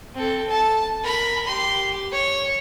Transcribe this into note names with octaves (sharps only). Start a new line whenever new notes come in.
C4 A4
A5
A#4 B5
G4 C6
C#5